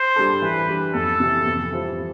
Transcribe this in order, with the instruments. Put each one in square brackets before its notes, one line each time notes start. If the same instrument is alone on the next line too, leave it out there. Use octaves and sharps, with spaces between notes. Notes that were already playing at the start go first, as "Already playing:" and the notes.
Already playing: [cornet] C5
[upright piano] G3 D4 A4
[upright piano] E3 [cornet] B4
[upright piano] G3 D4
[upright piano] F2 [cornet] A4
[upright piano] C3 E3
F2
E3 G3 C4 F4